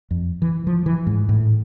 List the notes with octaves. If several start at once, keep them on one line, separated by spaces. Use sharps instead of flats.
F2
E3
F3
E3
G#2
A2